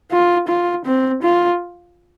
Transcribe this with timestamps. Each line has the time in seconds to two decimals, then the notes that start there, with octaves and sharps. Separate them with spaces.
0.11 F4
0.48 F4
0.85 C4
1.23 F4